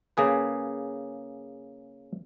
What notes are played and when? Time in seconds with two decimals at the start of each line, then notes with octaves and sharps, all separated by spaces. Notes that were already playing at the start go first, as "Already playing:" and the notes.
0.17 C#3 A#3 G#4 B4